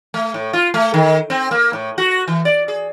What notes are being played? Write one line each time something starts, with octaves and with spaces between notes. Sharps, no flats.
A3
A2
F4
A3
D#3
C4
A#3
A2
F#4
E3
D5
G#4